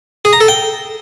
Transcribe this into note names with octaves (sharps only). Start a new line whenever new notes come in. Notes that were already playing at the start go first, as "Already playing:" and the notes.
G#4
A#5
A4
G5